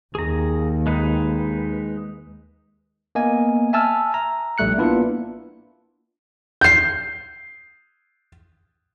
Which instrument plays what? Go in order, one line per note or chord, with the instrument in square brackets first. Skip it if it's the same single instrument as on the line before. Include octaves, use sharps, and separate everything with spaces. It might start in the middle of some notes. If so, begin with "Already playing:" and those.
[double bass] D#2 [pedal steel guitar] G#4 A#5
[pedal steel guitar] G#3 D#4 B4
[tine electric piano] A#3 B3 D#5 G#5
E5 G#5 A5 E6 F6
A#5
A#1 G3 A3 F#6 C#7
A#3 B3 D4 E4 F4 B4
[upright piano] G6 C7